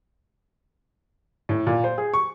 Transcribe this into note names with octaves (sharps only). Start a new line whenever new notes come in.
A2
A#2
C5
G#4
C#6